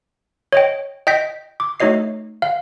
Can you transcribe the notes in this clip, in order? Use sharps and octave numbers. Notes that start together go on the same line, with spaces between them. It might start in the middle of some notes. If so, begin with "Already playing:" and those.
C#5 D#5 G5
D#5 G5 G6 B6
D6
A3 D#4 F#4 C#5 D#5 C7
F5